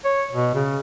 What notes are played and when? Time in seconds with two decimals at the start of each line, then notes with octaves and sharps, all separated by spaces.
0.05 C#5
0.33 B2
0.55 C#3